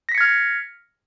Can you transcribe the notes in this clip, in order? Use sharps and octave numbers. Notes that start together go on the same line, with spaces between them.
F6 G#6 A#6 B6 C#7